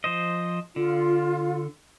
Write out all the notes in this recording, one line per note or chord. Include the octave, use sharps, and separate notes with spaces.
F3 C5 D#5
D3 F4